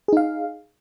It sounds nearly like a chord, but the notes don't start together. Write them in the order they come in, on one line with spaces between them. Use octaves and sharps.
G#4 D#4 F5